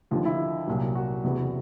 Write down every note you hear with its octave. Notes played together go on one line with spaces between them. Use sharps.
D#2 D3 F3 F4
E4
C2 A#2 F#3
F#4
F#1 E2 C3 E3